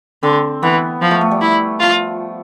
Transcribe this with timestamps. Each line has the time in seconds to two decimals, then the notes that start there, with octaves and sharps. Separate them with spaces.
0.23 D3 C4
0.63 E3 B3
1.02 F3
1.11 A3
1.21 A3
1.31 G3
1.41 E4
1.80 F3 F4